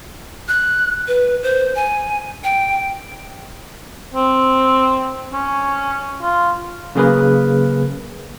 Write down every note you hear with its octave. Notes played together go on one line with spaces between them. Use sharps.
F#6
B4
C5
G#5
G5
C4
C#4
F4
C#3 F#3 A#3 G#4 A#4 B4